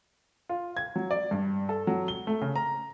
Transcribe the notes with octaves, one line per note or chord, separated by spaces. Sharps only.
F4
G#6
F#3
D5
G2
A4
F#3
G7
A3
C#3
A#5